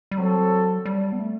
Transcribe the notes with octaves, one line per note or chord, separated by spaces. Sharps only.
G3
F#3 C4 F#4 A4
G3
B3
A3